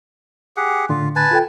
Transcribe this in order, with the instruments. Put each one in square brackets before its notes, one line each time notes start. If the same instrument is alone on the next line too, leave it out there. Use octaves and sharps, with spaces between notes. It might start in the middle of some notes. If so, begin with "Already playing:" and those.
[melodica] G4 G#4 F#5
[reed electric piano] A2 D3 [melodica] F4
[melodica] B4 G#5 A5
[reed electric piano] F4 A4 G5